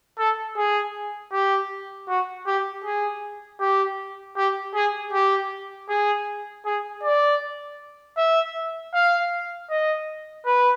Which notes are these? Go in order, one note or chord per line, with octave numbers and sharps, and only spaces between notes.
A4
G#4
G4
F#4
G4
G#4
G4
G4
G#4
G4
G#4
G#4
D5
E5
F5
D#5
B4